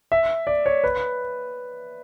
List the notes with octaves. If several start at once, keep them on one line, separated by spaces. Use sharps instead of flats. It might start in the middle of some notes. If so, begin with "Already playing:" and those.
E5
D5
C#5
B4